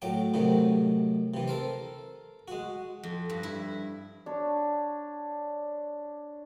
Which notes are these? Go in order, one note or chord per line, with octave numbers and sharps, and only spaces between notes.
A2 F#3 G5
A2 C3 D#3 F#3
C3 E3
A4 A#4 C5
G#3 F#4
F2
G2
E4
D4 C#5